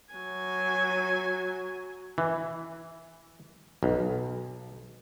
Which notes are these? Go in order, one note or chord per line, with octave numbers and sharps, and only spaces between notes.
F#3 G#5
E3
B1